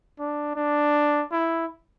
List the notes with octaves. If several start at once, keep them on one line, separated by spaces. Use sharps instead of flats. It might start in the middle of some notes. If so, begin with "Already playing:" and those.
D4
D4
E4